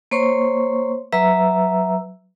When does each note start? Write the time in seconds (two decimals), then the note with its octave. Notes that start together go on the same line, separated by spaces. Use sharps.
0.11 A#3 C5 C#5 C6 C#6
1.12 F#3 B4 E5 A#5 E6